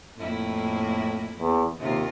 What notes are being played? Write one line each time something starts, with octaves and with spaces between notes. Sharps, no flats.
F2 A2 A#3 E4
E2
D#2 C3 F4